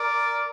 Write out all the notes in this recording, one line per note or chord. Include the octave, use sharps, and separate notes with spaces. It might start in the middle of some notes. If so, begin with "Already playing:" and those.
Already playing: A#4 D5